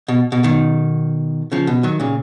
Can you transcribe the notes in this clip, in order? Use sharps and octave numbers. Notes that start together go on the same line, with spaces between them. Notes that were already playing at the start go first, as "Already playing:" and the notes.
B2
B2
B2 D#3
C#3 F3
B2
D#3 F#3
A#2 C#3